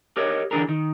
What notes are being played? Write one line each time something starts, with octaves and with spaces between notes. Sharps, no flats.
G4 A#4 C#5 D#5
D3 E3 D4 G#4 A#4
D#3